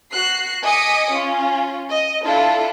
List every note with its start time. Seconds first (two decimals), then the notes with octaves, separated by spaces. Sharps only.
0.11 F#4 F#6 C7
0.63 D#5 G#5 D6 D#6 B6 C#7
1.12 C#4 F4
1.88 D#5
2.23 D4 E4 F4 A4